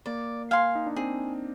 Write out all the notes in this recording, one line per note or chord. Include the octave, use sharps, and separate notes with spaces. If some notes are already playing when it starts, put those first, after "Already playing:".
A#3 D5
F5 G#5 C6
D#4
D4
C4 G#4